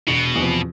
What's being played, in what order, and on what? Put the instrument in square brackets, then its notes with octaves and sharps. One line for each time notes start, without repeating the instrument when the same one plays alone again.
[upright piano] E1 [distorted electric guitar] B2
[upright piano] E2 C3 F3